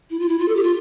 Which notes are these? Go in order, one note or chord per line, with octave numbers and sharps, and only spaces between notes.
E4
F4
E4
F4
A4
G4
F4